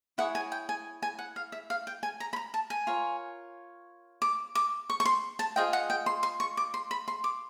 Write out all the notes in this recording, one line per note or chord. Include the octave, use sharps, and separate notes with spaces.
E4 G#4 C#5 F#5
G#5
G5
G#5
G#5
F#5
F5
E5
F5
G5
G#5
A#5
B5
A#5
A5
G#5
F4 A#4 C#5
D6
D6
C#6
C#6
C6
A5
F4 G#4 C5 D#5 G5
F#5
G5
C6
C6
C#6
D6
C6
B5
C6
D6